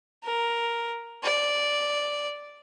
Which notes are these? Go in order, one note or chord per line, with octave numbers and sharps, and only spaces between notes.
A#4
D5